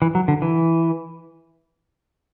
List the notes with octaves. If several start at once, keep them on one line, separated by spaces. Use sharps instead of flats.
E3
F#3
D3
E3